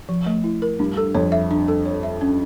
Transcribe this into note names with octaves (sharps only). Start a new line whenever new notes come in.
F3
A3
E4
A#4
G2 D4
A4
F2 C#5
E5
D4
A4
C#5
E5
C#4